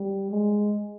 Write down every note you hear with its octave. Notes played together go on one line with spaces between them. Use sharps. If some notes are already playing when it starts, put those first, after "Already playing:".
Already playing: G3
G#3